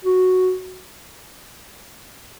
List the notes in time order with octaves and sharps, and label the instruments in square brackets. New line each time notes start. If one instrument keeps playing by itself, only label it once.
[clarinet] F#4